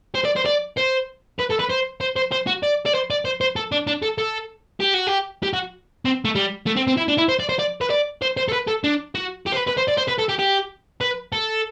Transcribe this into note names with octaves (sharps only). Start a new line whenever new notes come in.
C5
D5
C5
D5
C5
B4
A4
B4
C5
C5
C5
C5
F#4
D5
D5
C5
D5
C5
C5
A4
D4
D4
A4
A4
G4
F#4
G4
G4
F#4
C4
A3
G3
A3
C4
C4
E4
D4
E4
C5
D5
C5
D5
B4
D5
C5
C5
A4
B4
A4
D4
F#4
G4
C5
B4
B4
C5
D5
C5
B4
A4
G4
G4
B4
A4